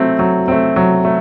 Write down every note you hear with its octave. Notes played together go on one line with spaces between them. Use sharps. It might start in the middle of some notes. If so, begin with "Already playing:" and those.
Already playing: F#3 A3 C4
F#3
A3 C4
F#3
A3